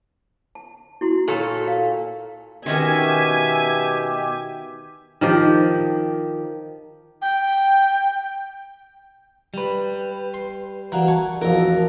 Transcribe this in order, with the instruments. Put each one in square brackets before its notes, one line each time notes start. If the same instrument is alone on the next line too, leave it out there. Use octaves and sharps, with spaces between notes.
[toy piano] A5
E4 F#4 C6
[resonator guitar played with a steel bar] A#2 A4 C#5
[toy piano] F5
[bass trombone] B2 [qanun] D#3 C#4 A#4 [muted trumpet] G4 [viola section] E5 G#5
[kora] D#3 F3 G4
[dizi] G5
[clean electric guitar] G3 B4
[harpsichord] C6
[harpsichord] E3 A#3 D4 [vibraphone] F#4 F#5 A#5
[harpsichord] G#5 C#6 [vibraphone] A5
[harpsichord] A1 F2 [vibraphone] F#4 F5 [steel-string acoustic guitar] A#4